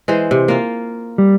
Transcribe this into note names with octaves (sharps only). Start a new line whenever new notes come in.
E3 G#3 C5
C3
A#3 F4
G3